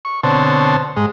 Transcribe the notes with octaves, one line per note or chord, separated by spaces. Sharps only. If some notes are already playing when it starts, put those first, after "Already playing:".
C#6
B2 D3 C4 C5 C#5 A5
G#2 G#3